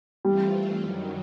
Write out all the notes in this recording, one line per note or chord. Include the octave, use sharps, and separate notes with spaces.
E3 G3 A3 C4 F4
F#2 D#3 F#3